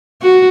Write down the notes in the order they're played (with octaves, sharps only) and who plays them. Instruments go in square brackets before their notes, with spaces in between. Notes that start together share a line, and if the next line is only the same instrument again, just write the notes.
[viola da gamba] F#4